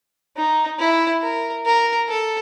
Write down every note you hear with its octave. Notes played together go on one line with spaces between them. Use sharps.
D#4
E4
A#4
A#4
A4